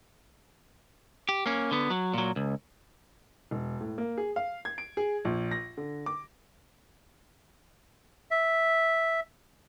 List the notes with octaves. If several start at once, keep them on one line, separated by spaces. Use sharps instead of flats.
G4
A#3 C#4
D3 B3
F#3
A#2 F#3
C#2
E1
A2
A#3
G#4
F5
G#6
D7
G#4
A#1
A#6
D3
D6
E5